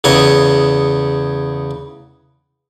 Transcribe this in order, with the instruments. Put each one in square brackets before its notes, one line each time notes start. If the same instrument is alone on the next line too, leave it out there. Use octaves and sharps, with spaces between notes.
[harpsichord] E2 C#3 C#5 D#5